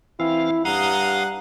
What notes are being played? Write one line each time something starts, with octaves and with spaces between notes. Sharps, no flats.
E3 C4 E4 F5
G2 F5 F#5 A#5 D#6